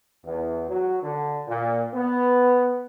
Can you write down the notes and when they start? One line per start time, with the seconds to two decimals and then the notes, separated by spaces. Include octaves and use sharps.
0.25 E2
0.68 F#3
1.03 D3
1.48 A#2
1.93 B3